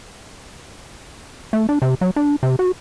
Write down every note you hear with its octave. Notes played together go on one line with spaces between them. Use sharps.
A3
D4
C3
F#3
D4
C3
F#4